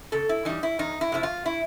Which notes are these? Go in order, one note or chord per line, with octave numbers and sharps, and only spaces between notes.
C#3 A4
E4
E3 G3 D#4
E4
E2 D#4
E4
C3 F3 E4
F4
E4